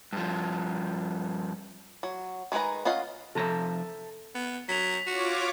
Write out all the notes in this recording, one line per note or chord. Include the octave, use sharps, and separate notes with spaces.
G2 F3
F#3
D#3 G#3 G#4 B4 A#5
C#4 F4 D#5 F5 F#5
C3 F3 A4 E5 A#5
B3
F#3 B6 F7
F4 F#4 C#5 D6